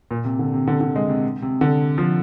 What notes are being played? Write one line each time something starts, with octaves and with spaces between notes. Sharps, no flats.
A#2
C3
D3
C3
D3
D3
G#3
C3
C3
D3
F3